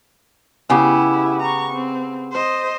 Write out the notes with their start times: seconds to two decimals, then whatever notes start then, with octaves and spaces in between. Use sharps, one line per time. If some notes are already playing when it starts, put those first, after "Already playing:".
0.70 C#3 B3 E4 G4
1.42 A#5 C#6
1.72 C4
2.32 C5 D#5